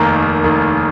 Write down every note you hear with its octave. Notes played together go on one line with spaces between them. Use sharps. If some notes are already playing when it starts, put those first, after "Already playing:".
Already playing: F1 D#2 D#3 A#3 A#5
F1 D#2 D#3 A#3